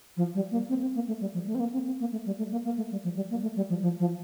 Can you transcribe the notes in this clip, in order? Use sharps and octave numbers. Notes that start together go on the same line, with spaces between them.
F3
G3
A#3
C4
C4
A#3
A3
G3
F3
A3
C4
A#3
C4
C4
A#3
A3
G3
A3
A#3
A#3
A3
G3
F3
G3
A#3
A3
G3
F3
F3
F3